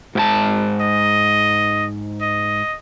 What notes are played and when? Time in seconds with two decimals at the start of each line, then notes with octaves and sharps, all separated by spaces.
0.15 G#2 G4 A5
0.81 D#5
2.22 D#5